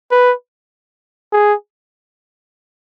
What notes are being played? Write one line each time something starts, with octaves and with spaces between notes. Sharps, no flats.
B4
G#4